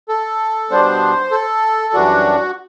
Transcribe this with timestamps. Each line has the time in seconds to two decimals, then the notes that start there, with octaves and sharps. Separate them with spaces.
0.09 A4
0.70 B2 G3 B3 D4 C5
1.31 A4
1.93 F#2 E3 G3 D4 F#4